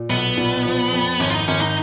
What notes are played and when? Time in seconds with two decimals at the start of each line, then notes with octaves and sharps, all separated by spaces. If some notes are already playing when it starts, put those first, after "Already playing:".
Already playing: A#2
0.10 B1 B3
0.37 A#2
0.65 F3
0.92 F2
1.19 G#1 C#4
1.30 F4
1.34 D#4
1.48 G#1 C#4
1.61 D#4